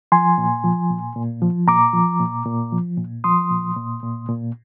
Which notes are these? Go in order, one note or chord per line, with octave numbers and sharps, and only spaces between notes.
F3 G#5 C6
A#2
F3
A#2
A#2
F3
A#2 A#5 D6
F3
A#2
A#2
F3
A#2
F3 C6 D#6
A#2
A#2
A#2
A#2